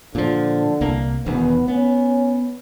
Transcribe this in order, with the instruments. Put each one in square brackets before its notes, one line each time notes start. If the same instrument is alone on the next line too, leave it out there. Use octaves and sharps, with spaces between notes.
[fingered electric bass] A#2 F3 [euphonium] D3
[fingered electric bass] C2 A#3
[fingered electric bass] E1 E2 D#3 [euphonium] B3
[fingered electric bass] B3 [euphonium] C#4